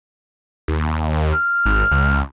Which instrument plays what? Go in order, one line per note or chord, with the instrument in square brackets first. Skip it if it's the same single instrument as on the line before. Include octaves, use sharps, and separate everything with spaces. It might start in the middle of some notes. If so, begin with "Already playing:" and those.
[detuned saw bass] D#2
[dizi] F6
[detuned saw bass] G#1
C#2